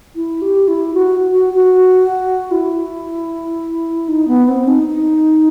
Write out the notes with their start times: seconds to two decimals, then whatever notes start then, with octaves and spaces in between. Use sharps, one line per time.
0.16 E4
0.42 G4
0.68 E4
0.94 F#4
1.33 F#4
1.53 F#4
2.51 E4
4.08 D#4
4.28 B3
4.48 C4
4.68 D#4
4.87 D#4